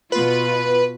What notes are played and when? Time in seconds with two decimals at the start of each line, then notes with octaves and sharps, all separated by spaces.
0.12 B2 B3 F4 B4